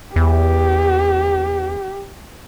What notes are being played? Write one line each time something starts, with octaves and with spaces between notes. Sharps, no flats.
E2 G4